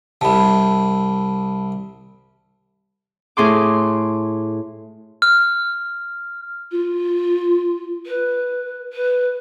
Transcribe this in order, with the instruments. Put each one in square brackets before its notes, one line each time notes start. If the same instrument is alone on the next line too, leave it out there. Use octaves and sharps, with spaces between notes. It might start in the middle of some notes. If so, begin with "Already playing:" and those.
[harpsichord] C2 C3 [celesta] A5 B5
[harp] A2 G#4 C6 D6
[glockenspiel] F6
[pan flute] F4
B4
B4